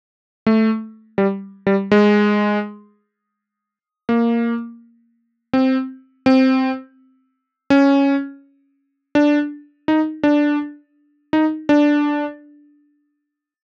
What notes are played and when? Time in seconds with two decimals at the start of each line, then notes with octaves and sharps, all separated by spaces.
0.46 A3
1.18 G3
1.67 G3
1.91 G#3
4.09 A#3
5.53 C4
6.26 C4
7.70 C#4
9.15 D4
9.88 D#4
10.23 D4
11.33 D#4
11.69 D4